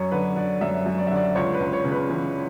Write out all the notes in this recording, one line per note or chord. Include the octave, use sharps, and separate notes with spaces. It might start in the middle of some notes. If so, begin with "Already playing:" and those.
Already playing: F#2 C#5
D3 B4
D3 D5
F#2 E5
F#2
D5
E5
D3 D5
C#2 C#5
B4
C#2
C#5
C#3
B4
E3